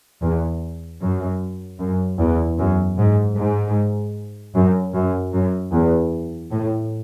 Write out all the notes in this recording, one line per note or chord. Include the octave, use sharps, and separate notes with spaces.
E2
F#2
F#2
E2
F#2
G#2
G#2
F#2
F#2
F#2
E2
A2